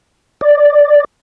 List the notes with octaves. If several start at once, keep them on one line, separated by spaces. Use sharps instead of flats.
D5